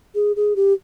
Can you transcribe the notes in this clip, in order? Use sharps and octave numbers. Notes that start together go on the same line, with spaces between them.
G#4
G#4
G4